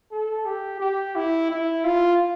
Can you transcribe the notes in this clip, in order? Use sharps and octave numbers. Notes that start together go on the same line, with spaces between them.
A4
G4
G4
E4
E4
F4